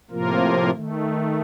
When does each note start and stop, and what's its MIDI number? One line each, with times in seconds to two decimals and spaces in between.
0.11 0.71 45
0.11 0.71 48
0.11 0.71 53
0.11 0.71 58
0.11 0.71 65
0.11 0.71 70
0.74 1.42 51
0.74 1.42 57